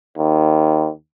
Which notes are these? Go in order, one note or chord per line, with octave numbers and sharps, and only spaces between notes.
D#2